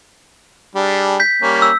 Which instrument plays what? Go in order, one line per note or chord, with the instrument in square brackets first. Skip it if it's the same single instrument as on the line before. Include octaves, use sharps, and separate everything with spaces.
[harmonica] G3 D4 G#4
[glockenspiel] G6 B6
[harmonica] G3 A#3 C#4
[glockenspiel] E6